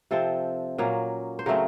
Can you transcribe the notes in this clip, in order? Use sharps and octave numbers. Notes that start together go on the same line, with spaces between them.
C3 F3 C4 A4
A#2 F#3 A#3 C#4
C5
C#3 F#3 A3 C4 A#4